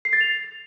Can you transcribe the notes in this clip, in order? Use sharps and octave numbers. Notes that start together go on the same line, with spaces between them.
C7
A6
F7